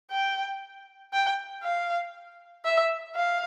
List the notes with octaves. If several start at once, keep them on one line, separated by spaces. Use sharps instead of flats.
G5
G5
F5
E5
F5